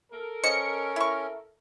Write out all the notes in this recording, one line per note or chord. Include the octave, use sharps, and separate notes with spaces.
A4 A#4
C#3 C#4 C5 D#5 C#7
E4 C#6